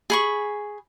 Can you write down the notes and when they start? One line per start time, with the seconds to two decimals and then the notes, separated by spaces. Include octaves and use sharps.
0.10 G#4 B5 C#6